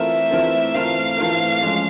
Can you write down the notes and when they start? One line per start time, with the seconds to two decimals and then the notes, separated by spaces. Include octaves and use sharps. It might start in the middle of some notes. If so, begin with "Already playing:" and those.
Already playing: E3 A3 C4 F4 A#4 E5
0.31 E3 A3 C4 F4 A#4
0.74 E3 A3 C4 F4 A#4 F5
1.17 E3 A3 C4 F4 A#4
1.62 F3 G#3 C#4